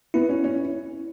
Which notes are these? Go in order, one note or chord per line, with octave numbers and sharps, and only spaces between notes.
B3 E4
C#4
C#4